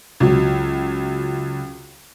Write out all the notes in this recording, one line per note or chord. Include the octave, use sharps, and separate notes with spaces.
C#2 F#3